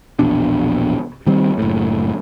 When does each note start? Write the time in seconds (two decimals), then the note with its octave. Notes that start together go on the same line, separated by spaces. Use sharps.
0.19 A#1 E2 B2 D4
1.27 D#3 G3 C4
1.58 F#1 A2